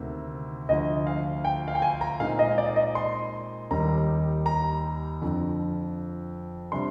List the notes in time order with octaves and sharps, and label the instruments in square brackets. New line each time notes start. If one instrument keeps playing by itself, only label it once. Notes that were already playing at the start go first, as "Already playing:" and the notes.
Already playing: [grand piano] D2 C3 D#3 A#3
D2 D3 F3 D#5
F5
G5
F5
G5
G#5
A#5
A#2 G#3 C4 D#4 F5
D#5
D5
D#5
C6
D#2 D#3 G3 A#3 D#4 A#5
A#5
F2 D3 F3
C3 G3 D4 C6